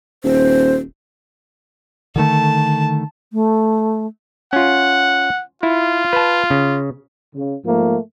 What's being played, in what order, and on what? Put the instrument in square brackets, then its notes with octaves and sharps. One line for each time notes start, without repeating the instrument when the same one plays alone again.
[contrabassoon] D#1 [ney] C5
[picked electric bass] D3 D#3 A3 [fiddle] A5
[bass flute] A3
[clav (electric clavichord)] C#4 F4 [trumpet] F#5
[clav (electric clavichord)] E4 [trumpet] F4
[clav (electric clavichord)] B4 A5
C#3
[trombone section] C#3
G#2 F3 A3 A#3